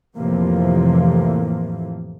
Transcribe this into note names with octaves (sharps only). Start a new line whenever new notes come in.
F2 A2 C3 E3 F3 A#3